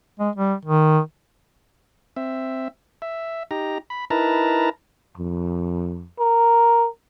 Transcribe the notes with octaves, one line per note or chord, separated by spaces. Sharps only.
G#3
G3
D#3
C4 E5
E5
D#4 G4 A#5
B5
D#4 E4 A#4 B4 A5 A#5
F2
A#4